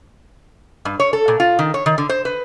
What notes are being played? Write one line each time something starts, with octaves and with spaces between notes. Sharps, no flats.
G2
C#5
A4
A#2
F4
D#3
C#5
D#3
D3
C5
B4